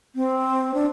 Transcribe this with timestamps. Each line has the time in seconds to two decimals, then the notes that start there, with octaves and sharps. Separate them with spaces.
0.16 C4
0.74 D4